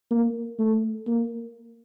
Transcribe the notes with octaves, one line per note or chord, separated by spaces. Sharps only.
A#3
A3
A#3